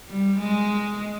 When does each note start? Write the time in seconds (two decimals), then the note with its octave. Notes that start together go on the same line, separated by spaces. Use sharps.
0.09 G3
0.38 G#3